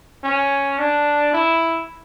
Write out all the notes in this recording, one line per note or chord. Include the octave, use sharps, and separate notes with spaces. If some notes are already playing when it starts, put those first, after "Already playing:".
C#4
D4
E4